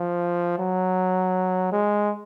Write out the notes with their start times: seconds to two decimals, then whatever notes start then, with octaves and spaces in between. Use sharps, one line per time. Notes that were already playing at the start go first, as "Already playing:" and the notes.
Already playing: F3
0.59 F#3
1.72 G#3